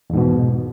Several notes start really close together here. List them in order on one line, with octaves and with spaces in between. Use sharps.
E2 G#2 B2